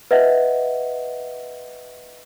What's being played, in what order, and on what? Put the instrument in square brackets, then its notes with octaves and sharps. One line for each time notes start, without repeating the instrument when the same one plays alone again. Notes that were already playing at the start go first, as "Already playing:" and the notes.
[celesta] B4 D#5 E5 F#5